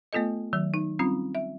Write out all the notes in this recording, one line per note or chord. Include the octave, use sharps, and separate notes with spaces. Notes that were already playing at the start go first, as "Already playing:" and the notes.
A3 B3 F4 A4 D#5
D#3 F#3
D#4
G3 C4 C#4 F4
E5